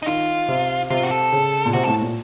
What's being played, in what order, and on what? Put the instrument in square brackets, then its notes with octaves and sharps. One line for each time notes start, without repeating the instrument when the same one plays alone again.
[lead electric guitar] D#4
[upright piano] D#3 [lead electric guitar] F4
[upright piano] C3
[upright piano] C3 [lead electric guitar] F4
[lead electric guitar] F#4
A4
[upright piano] C#3
A#2
[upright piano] C3 [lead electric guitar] F#4
[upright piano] A2 [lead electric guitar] A4
[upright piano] A#2